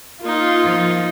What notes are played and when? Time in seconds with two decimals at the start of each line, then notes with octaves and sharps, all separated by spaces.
0.22 A#3 D#4 F4
0.64 F3